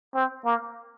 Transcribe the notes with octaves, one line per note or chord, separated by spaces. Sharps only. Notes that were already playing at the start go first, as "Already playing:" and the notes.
C4
A#3